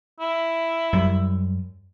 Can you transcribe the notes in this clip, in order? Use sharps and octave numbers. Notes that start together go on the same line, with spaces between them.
E4
F#2 G3